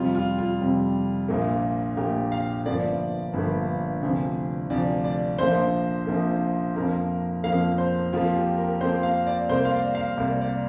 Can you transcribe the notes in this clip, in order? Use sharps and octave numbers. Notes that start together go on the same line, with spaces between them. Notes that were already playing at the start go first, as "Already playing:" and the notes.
Already playing: F2 C3 G3 F4
F4
F4
F2 C3 G3
A#1 A#2 A#3
A#1 A#2 A#3 G4
F5
G1 G2 F3 A#3 D5
G1 G2 F3 A#3
D2 C3 F3
D2 C3 F3 D5
D5
A#1 A#2 F3 A#3 C5
A#1 A#2 F3 A#3
F2 F3 A#3 A#4
F2 F3 A#3 F5
C5
F2 F3 A#3 F4
G4
A#4
F2 F3 A#3 C5
F5
D5
C2 C3 A#3 C5
F5
D5
F5
C2 C3 A#3 D5
D5